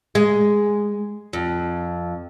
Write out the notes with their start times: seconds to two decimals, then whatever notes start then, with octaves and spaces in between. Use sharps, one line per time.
0.15 G#3
1.33 F2